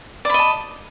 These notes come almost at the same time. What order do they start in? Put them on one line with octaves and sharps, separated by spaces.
D5 B5 D#5 A5